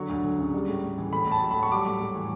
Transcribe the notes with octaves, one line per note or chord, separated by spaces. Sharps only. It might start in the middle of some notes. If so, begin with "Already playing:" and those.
Already playing: D3 F#3 C#6
D2
D2
C#3
G3
A2
A2
E3
A2 B5
A2 A5
F#3
B5
F#3
C#6
G3 D6
A2
A2
E3